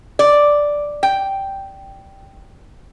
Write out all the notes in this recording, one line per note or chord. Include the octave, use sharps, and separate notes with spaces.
D5
G5